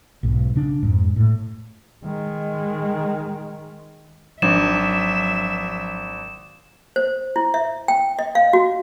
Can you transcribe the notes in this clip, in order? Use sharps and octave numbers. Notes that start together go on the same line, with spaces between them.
B1 G#2
C#3 D4
F2 G#2
A2
D#3 G#3
G#1 F3 F#3 D4 E5 D6 E7
C5
E4
E5
G5
D#5
F5
F#4